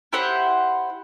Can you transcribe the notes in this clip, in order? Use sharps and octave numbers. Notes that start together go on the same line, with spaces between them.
E4 G4 C5 F#5